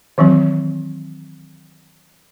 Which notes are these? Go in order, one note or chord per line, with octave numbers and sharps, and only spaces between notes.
D#3 E3 F#3 C4